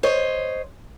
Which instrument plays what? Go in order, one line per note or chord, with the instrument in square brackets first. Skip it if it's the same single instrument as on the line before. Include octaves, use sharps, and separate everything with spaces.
[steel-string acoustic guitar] C5 C#5 D#5